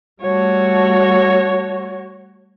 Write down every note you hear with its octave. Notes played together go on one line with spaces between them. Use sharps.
G3 A3 F#4 C#5